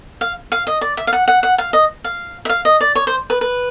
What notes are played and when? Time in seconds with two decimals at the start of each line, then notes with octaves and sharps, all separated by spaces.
0.21 F5
0.52 F5
0.67 D#5
0.81 D5
0.97 E5
1.07 F5
1.13 F#5
1.28 F#5
1.43 F#5
1.58 F5
1.73 D#5
2.04 F5
2.45 E5
2.49 F5
2.65 D#5
2.81 D5
2.95 C#5
3.07 C5
3.30 B4
3.41 B4